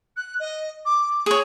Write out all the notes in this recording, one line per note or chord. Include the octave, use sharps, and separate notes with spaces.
F#6
D#5
D6
G#4 C#5